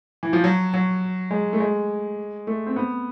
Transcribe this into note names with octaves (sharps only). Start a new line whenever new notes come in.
E3
F3
F#3
F#3
G#3
A3
G#3
A3
C4
B3